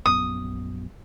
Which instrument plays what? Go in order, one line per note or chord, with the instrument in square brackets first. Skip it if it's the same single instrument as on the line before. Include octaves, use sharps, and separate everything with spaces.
[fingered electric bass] A#1 F#2 B3 [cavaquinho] D#6